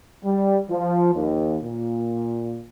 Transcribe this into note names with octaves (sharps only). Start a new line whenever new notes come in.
G3
F3
D#2
A#2